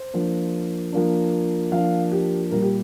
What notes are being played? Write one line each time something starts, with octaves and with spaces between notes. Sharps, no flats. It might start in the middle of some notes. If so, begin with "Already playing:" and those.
Already playing: C5
F3 A#3 D4
F3 A#3 D4
F3 A#3 D4 F5
G4
A#2 G3 A#3 A#4
G4